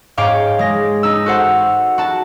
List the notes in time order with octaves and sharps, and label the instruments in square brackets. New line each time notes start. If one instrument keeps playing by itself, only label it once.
[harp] G#2 C#5 F5 G5 D6
G#3 A#6
D#4 E6
F#4 A4 C5 F#5
F#4 A5